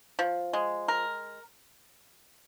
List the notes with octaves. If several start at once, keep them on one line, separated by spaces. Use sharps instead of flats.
F3
G#3
A#4